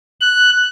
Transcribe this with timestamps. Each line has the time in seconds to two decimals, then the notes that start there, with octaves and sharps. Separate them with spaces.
0.21 F#6